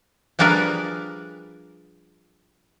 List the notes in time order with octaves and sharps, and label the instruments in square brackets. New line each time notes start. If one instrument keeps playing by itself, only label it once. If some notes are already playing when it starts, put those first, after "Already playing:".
[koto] F3 G3 D4 G#4 A#4 B4